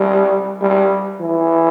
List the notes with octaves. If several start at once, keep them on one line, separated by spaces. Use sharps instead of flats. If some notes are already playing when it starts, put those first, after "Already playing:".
Already playing: G3
G3
E3